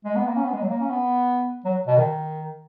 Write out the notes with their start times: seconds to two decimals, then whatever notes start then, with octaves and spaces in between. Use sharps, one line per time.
0.05 G#3
0.16 B3
0.27 A#3
0.36 C#4
0.45 B3
0.53 G#3
0.62 F#3
0.69 A#3
0.80 C#4
0.91 B3
1.65 F#3
1.87 B2
1.98 D#3